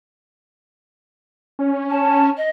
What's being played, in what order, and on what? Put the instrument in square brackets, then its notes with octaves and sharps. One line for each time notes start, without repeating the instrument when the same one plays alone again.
[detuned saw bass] C#4
[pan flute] A5
D#5